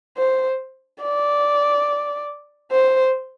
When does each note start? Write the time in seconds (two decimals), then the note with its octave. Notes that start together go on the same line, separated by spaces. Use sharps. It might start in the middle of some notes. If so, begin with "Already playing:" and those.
0.17 C5
1.02 D5
2.71 C5